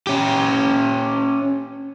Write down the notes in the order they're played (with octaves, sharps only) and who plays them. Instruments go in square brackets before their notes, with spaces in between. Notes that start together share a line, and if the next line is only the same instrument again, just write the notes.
[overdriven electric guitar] C#4 G4